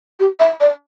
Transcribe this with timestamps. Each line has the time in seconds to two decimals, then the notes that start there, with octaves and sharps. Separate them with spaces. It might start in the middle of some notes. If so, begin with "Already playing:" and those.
0.20 G4
0.40 E5
0.60 D5